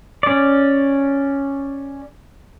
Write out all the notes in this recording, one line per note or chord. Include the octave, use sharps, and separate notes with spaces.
C#4 D5